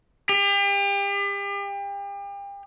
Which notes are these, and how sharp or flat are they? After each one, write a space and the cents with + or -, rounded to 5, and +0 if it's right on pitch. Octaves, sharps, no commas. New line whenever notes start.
G4 +35